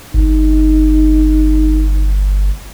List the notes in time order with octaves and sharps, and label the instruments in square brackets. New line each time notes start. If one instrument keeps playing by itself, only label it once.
[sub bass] G1 [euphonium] D#4